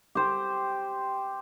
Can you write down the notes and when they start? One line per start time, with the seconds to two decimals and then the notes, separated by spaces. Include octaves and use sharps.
0.15 G4 C5